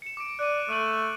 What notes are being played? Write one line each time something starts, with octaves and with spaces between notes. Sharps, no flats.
C#7 E7
D6 D7
D5 F#6 D#7
A3 E6 D#7 F#7